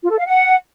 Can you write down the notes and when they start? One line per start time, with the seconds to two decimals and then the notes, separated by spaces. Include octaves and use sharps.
0.03 F4
0.10 A4
0.18 F5
0.25 F#5